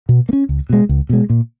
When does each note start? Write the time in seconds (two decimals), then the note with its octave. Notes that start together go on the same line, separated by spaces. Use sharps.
0.09 B2
0.29 A#3
0.33 C#4
0.49 C#2
0.69 B2 G#3
0.89 C#2
1.09 B2 G#3
1.30 A#2